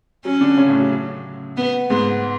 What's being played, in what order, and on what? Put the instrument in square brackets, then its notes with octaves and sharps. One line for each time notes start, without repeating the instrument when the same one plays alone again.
[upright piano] F#3 [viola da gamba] C#4
[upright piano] D3 D4
C#3 C#4
A2 A3
F#3
F#3
[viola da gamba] B3
[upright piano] G#2 G#3 [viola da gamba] B3